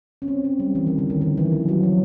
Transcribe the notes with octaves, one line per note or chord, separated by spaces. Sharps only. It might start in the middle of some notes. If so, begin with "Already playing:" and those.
C#4
C4
C#4
G3
E3
D#3
D3
D#3
D#3
E3
F3
F#3
F3